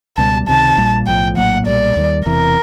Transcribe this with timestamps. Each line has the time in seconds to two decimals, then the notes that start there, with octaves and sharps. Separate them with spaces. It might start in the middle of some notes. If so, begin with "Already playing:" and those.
0.17 C#2 B2 G3 A5
0.47 C#2 C3 D#3 A5
0.77 A#1 A#2 G3 A#3
1.07 B1 A2 F3 G5
1.37 A#1 A2 F#3 A#3 F#5
1.66 B1 A#2 G3 D5
1.96 D#2 D#3 G3
2.26 E1 E2 C3 E3 A#4